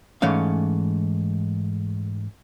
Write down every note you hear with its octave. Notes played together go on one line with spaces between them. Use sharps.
G#2 E3 A3 C#4 F5